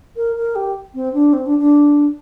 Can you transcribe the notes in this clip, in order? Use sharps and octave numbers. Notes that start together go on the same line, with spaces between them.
A#4
A#4
G4
C4
D4
C4
D4
D4